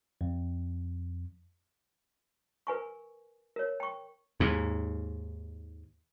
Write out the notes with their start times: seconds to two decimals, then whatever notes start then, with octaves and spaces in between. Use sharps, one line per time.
0.21 F2
2.67 A#4 B4 G#5 C#6
3.56 A#4 C#5
3.80 G5 C#6
4.40 D#2 G#2